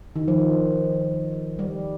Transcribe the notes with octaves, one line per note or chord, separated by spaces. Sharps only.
D#3
F3
G3